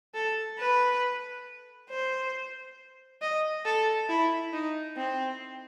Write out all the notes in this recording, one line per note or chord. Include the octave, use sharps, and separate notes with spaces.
A4
B4
C5
D#5
A4
E4
D#4
C4